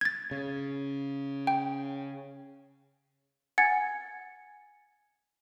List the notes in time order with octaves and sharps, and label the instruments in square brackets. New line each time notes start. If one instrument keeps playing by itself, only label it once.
[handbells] G#6 A6
[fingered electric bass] C#3
[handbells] G5
[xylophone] F#5 G#5 G#6 A6 C#7